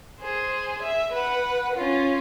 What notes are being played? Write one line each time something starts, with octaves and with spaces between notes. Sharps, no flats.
G#4 C5
E5
B4 F#5
C#4 F4